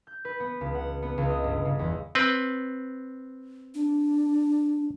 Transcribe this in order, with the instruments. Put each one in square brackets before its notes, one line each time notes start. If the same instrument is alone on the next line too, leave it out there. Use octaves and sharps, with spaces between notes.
[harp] G6
B4
B3
C#2
F#5
B3
C#2
D#5
G1
C#3
E2
[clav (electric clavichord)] C4 B4
[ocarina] D4